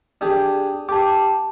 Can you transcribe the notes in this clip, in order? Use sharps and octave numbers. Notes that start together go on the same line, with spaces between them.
D4 G4 G#4
G4 A5 D6